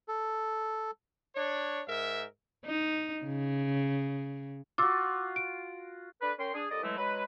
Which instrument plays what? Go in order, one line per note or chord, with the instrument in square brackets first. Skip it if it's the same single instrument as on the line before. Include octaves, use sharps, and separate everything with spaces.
[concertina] A4
[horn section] D4 C#5
G#2 A#4 E5
[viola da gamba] D#4
C#3
[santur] F4 F#4 [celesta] D6 E6
[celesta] D7
[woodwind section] D4 A4 B4
C#4 A#4 G5 C6
D4 G#4
C2 A4 D5 D#5
E3 F#3 G#3 A3
F#3 G#3 B4